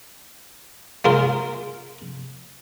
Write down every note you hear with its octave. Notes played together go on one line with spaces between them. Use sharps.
G#3 A#3 F4 A#4